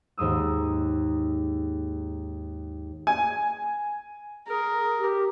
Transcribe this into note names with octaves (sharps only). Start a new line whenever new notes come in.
D#2 G#2 A#3 D#6 E6
G#5
G#4 A#4
G4